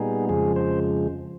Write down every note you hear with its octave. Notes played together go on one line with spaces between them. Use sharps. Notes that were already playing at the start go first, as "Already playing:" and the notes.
Already playing: A#2 G3 B3 D#4 G#4
F2 C#3 F3 G#3 G#4
C5